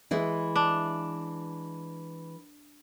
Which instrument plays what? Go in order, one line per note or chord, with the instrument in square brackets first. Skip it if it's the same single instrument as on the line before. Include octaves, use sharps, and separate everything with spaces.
[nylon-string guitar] E3 G#3 E4
[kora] D4